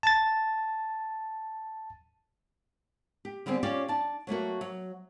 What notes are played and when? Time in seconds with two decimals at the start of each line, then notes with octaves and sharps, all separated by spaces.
0.03 A5 A6
3.25 G4
3.46 D3 G3 B3 C4 G#4
3.63 C#4 F4 G4 C#5 D5
3.88 D4 A5
4.27 F#3 A3 A#3 F#4
4.61 F#3